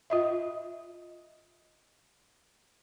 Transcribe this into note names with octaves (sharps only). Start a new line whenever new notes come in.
F4 D#5 E5